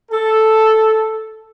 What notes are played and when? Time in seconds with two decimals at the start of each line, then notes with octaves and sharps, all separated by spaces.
0.12 A4